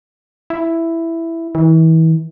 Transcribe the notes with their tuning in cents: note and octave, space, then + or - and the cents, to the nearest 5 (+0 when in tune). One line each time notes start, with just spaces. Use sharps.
E4 +5
E3 -35